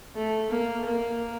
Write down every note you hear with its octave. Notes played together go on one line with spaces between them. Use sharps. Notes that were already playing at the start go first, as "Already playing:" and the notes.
A3
A#3
A#3